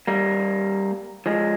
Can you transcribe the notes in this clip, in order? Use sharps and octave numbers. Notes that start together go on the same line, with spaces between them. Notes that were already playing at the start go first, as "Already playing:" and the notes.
G3 A#3
F3 G#3